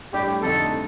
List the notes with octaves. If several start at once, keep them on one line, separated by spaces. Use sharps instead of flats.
A2 G3 D4 G4
F2 D3 A3 D#4 A4
C3